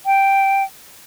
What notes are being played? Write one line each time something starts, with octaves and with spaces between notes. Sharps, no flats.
G5